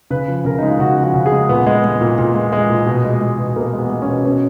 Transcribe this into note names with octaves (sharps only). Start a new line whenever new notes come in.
C#3 B4
F3
C#3 A#4
G#3 D#4
F4
C#3 F#4
F3
F#4
C#3
G#4
G#3
A#2 B3
G#3
G#3
A#2
A#2
G#3
G#3
A#2
B2
G#3
G#3
B2
B2 A#3
G#3 B3
G#3
C#4
B2
B2 C#4